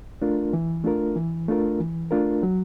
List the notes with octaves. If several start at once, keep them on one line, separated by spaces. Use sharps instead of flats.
A3 D4 F4 A#4
E3
A3 D4 F4 A#4
E3
A3 D4 F4 A#4
E3
A3 D4 F4 A#4
F#3